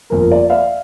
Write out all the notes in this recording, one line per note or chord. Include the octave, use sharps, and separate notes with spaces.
G1 F2 A#3 A#4
D5
D5 E5 F5